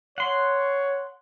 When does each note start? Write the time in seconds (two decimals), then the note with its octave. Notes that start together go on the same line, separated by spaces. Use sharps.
0.18 C#5 F#5 C6